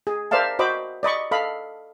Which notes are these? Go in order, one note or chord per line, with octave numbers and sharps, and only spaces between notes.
G#4
A#4 C5 D5 E5 F5 A5
F#4 C5 D#5 B5 D6
D5 D#5 B5 C#6
A4 D#5 F5 B5